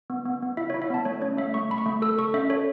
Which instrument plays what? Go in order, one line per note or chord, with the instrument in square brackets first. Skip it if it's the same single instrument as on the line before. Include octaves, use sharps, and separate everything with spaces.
[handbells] B3
B3
B3
E4 E5
E4 C#5
E5
B3 A5
A3 C#5
C#4 C#5
A3 E5
A3 C#6
A3 B5
C#6
A3
A4 E6
A4 C#6
C#4 E5
A4 C#5